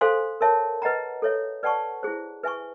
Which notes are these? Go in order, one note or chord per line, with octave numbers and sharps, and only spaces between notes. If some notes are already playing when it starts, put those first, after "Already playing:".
A4 C5 F5 G#5 C6
A#4 C#5 E5 A5
B4 D#5 F#5 A#5
A4 C#5 E5
B4 D5 F#5 A5 C#6
E4 G#4 C5
B4 E5 G#5 C#6